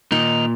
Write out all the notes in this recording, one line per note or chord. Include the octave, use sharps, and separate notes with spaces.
A#2 D#3 D#4